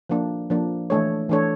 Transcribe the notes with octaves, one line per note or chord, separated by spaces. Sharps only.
F3 A#3 D4
F3 A#3 D4
E3 A3 D4 A4 C#5
E3 A3 D4 A4 C#5